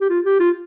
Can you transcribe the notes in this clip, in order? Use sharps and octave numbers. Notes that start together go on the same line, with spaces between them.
G4
F4
G4
F4